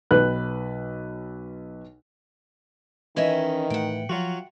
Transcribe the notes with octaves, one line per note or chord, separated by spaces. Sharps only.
B1 B4 F#6
D#3 E3 C#4 D#5 E5
A2 A3 F#5 G5
F3 F#3 F4 F#4